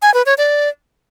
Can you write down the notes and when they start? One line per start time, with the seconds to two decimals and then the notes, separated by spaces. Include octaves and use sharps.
0.02 G#5
0.14 B4
0.26 C#5
0.38 D5